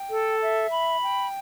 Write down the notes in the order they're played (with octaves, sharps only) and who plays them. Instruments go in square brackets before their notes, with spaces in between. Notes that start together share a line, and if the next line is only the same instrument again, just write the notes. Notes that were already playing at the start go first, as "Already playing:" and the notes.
Already playing: [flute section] G5
A4
E5
B5
G5